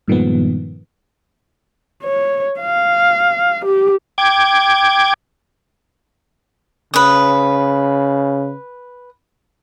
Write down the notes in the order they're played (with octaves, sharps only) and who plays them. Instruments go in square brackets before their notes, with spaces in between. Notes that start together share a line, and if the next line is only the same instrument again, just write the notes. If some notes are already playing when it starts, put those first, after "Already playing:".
[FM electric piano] G2 A#2 D#3 F3 G#3 B3
[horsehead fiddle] C#5
F5
G4
[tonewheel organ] G5 D6 G#6
[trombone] C#3 [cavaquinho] B4 D#6